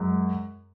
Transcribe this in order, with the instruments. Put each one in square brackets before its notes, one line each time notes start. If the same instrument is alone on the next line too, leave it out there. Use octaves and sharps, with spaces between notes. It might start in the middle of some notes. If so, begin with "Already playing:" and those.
Already playing: [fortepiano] F#2 G#3